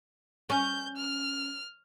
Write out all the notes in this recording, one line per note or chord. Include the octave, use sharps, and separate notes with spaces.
C#4 G6
F6